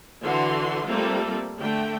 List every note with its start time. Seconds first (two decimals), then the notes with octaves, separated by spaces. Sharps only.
0.23 D3 E3 F#4 C6
0.86 G3 A3 A#3 C4 F4 A4
1.59 D3 A3 G5